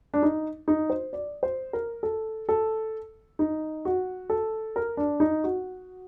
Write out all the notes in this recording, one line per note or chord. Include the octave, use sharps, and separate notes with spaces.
D4
D#4
D#4
C5
D5
C5
A#4
A4
A4
D#4
F#4
A4
A#4
D4
D#4
F#4